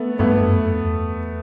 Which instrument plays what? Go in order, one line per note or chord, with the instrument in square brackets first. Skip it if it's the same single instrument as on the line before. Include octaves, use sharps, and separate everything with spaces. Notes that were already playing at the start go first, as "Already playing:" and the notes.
Already playing: [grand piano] A3 B3
[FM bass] G2 [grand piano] A3 B3
[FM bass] F#2
F2
E2